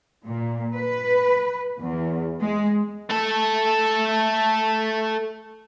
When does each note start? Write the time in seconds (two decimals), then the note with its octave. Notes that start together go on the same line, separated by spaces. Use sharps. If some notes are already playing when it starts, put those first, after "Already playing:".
0.24 A#2
0.74 B4
1.80 E2
2.40 G#3
3.10 A3 A4